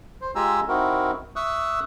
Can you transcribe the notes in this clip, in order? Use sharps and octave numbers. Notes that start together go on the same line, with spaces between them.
C5
G#3 F4 G4 G#5 A#5 E6
C4 D#4 E4 F#4 A#4
E5 C#6 D#6 E6 F#6